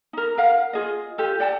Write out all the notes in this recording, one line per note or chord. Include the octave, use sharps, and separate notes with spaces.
D#4 A#4
A#4 F5 F#5
F4 G#4 D#5
F4 G4 A4
D5 F#5 G5 A5